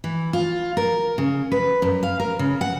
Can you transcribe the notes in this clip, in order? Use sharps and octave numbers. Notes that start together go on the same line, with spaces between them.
E3
F4
A#4
C#3
B4
F#2
F5
A#4
C#3
F#5